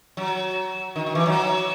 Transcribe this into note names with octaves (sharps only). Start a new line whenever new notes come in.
F#3
D#3
D#3
E3
F#3